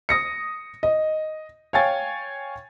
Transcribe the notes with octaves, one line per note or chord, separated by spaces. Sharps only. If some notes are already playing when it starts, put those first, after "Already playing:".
D#6 A#6 C#7
D#5
C#5 F5 G5 G#5 A6